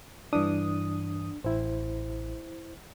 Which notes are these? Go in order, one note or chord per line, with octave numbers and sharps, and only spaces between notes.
G2 E3 D4 D#6
A1 E4 C5